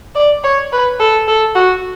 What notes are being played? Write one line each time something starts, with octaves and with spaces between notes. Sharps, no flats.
D5
C#5
B4
A4
A4
F#4